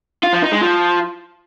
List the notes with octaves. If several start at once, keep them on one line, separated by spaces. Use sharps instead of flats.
F4
F3
D#4
G#3
F3